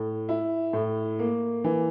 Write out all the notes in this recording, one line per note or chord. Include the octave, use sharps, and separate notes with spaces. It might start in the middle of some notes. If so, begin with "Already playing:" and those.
Already playing: A2
E4
A2
A#3
E3